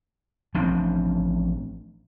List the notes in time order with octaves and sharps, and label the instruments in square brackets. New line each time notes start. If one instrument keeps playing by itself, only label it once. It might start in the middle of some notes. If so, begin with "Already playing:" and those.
[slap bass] A1 F3 C4 D4